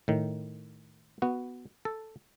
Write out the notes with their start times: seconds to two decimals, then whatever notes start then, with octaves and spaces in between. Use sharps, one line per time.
0.08 A2 D#3
1.22 B3 F#4
1.85 A4